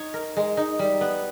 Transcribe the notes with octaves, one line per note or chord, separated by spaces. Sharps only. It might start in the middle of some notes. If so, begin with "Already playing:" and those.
Already playing: D#4 C#5
A#4
G#3
D#4
G3
B3